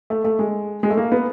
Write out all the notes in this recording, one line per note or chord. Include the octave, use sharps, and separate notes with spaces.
A3
A3
G#3
G#3
A3
A#3
B3